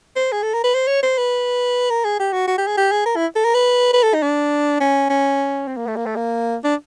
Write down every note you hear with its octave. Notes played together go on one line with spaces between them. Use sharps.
C5
G#4
A4
A#4
B4
C5
C#5
C5
B4
A#4
G#4
G4
F#4
F#4
G4
G#4
G4
G#4
A#4
E4
A4
A#4
B4
B4
A4
D#4
D4
C#4
C#4
C4
A#3
A3
A#3
A3
A#3
D4